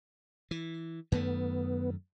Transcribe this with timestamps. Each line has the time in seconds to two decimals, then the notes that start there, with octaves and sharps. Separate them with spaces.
0.51 E3
1.12 F#2 D#3 A3 B3